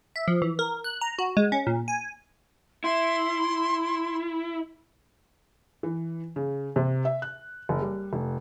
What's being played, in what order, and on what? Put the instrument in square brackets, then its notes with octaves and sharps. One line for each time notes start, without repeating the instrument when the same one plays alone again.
[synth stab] E5
F3
E3
A#4
F#6
A#5
F#4
G#3
C#4
A#2
G#5
[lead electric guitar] E4 [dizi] C6
[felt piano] E3
C#3
C3
E5
F#6
F#1
G3
F1